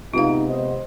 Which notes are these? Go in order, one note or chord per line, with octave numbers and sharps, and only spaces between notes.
C3 G#3 B3 D#4 F4 F5
C5 D#5